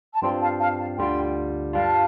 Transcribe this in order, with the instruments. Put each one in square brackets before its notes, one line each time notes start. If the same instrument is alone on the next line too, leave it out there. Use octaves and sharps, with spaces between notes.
[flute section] A5
[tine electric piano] G2 G3 C4 F4 [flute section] G5 C6
[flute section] F5 A5
F5 A5
F5 A5
[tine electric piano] D2 D3 G3 D4 F4 [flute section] G5 C6
[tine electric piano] G2 G3 D4 F4 [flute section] F5 A5